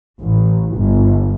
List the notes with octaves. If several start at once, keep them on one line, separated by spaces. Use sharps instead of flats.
A1
G1